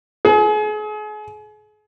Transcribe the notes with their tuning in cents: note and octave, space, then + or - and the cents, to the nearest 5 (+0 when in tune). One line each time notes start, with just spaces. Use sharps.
G#4 +35